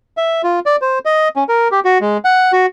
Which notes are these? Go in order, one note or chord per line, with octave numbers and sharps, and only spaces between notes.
E5
F4
D5
C5
D#5
C#4
A#4
G4
F#4
G#3
F#5
F#4